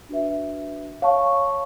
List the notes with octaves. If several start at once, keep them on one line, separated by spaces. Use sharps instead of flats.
D4 F#4 B4 E5
C#5 F5 A5 C#6